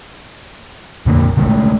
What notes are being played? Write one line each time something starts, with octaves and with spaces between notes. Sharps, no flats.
F2 A#2 D3 A#3
B2 D3 G#3 A3